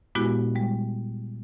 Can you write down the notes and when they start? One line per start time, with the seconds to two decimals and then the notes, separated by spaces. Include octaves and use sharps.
0.15 A#2 G#3 B3 E4 F#4 G4
0.55 G3 G#3